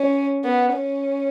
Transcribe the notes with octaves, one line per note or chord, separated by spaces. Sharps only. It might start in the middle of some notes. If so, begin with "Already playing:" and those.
Already playing: C#4
B3
C#4